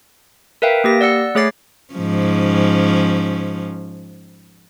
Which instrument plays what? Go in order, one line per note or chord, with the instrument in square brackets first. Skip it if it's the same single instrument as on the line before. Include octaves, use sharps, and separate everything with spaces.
[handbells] A#4 B4 E5 F5 G5
A#3 G4 A#6
D5 F#5 E6 C#7
A3 G#4 C#5 D6 A6 C7
[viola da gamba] G#2 F3 C#4